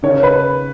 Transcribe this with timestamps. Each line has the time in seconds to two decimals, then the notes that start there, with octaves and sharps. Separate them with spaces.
0.03 C#3 C#5
0.23 B4